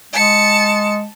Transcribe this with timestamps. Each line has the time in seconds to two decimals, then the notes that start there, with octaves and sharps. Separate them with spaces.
0.13 G#3 A5 C#7